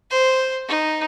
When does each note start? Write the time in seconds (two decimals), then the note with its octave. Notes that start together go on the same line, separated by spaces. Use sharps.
0.11 C5
0.68 D#4